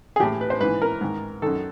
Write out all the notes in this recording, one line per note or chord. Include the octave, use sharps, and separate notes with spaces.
G#4
A2 E3 G4
B4
C5
G#2 E3 B4
A#4
G#2 D#3
F#2 D#3 A4